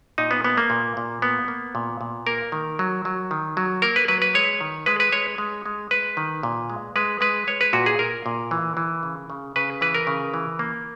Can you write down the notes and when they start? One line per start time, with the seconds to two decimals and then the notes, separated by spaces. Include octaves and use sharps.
0.18 A#2 D#4
0.31 B3
0.44 A#3 B3
0.57 A#3
0.70 A#2
0.97 A#2
1.22 A#3 B3
1.48 A#3
1.75 A#2
2.01 A#2
2.27 A#3 A#4
2.52 D#3
2.79 F#3
3.05 F#3
3.31 D#3
3.57 F#3
3.82 A#3 A#4
3.96 B4
4.08 F#3 B4
4.22 B4
4.34 G#3 C#5
4.61 D#3
4.86 G#3 B4
5.00 B4
5.12 G#3 C#5
5.38 G#3
5.66 G#3
5.91 G#3 B4
6.17 D#3
6.43 A#2
6.70 G#3
6.96 G#3 B4
7.21 G#3 B4
7.47 G#3 C#5
7.61 B4
7.73 A#2 F#4
7.86 G#4
7.99 A#2 A#4
8.26 A#2
8.51 E3
8.77 E3
9.03 C#3
9.30 C#3
9.56 C#3 B4
9.81 E3 B4
9.95 A#4
10.07 C#3
10.34 E3
10.59 A#3